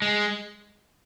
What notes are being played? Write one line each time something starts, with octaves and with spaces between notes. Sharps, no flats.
G#3